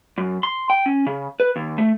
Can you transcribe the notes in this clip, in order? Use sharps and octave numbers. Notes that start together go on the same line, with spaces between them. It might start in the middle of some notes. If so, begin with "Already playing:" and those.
F#2
C6
G5
C#4
C#3
B4
D#2
A3